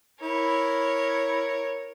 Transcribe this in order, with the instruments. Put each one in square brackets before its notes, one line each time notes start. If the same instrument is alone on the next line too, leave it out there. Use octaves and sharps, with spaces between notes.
[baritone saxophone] E4 [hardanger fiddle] A#4 C#5